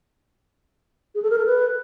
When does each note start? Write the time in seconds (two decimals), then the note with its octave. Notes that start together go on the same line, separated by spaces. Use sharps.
1.15 G#4
1.23 A4
1.30 A#4
1.38 A4
1.46 B4